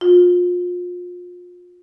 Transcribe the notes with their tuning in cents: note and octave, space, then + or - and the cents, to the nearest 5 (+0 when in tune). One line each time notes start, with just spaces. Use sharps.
F4 +30